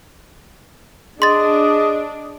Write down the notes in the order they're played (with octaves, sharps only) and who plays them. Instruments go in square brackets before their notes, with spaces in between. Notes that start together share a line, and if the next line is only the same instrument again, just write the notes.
[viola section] D4 [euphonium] G#4 [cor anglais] D#5 [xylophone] C6 A6